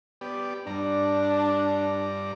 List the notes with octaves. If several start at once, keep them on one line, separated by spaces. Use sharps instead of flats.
B3 G4 D5
G2 D4 D5 A#5